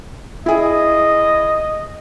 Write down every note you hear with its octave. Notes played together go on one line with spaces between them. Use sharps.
E4 G#4 D#5